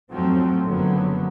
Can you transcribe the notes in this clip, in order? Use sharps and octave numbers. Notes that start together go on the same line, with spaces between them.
F2 G#2 F3 F#3 A3 C4
F#1 D3 F3 F#3 B3